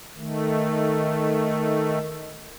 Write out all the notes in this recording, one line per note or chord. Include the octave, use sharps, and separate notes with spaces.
D#3 A3